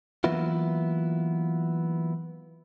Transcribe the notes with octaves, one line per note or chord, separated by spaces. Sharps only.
E3 F#3 A#3 B3 E4 F4